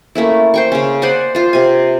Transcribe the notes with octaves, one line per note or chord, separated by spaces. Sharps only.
A3 A#3 C#4 E4
C5 G5 C#6
C#3 C#4
C5 D5 F#5 G#5
F4 C5
C3 G#5